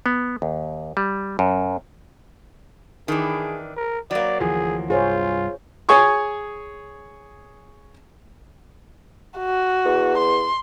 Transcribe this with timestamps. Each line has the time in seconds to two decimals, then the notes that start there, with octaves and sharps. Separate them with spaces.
0.06 B3
0.42 D#2
0.97 G3
1.39 F#2
3.08 D#3 E3 D4 G#4
3.76 A#4
4.11 F#3 A#3 D5
4.40 D2 E3 F3 G#4
4.90 C2 G2 F4 G#4 C5 C#5
5.89 G#4 C#5 G#5 C#6 D#6
9.39 F#4
9.85 E2
10.18 C6